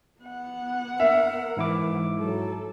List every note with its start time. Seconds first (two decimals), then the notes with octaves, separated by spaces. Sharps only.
0.20 B3 F#5
1.00 A#4 E5
1.57 G#2 E3 E4 D6
2.19 F#3 A4